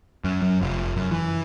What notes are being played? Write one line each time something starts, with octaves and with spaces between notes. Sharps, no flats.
F#2
F#2
F1
F#2
E3